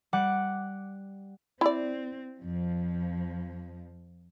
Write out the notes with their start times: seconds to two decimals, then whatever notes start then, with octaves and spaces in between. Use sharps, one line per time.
0.13 G3 F#5 D6
1.61 C4 E4 D5
2.40 F2 F3